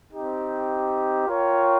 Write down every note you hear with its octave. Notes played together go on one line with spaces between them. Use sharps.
C4 D#4 G4
F4 A#4 C#5 G5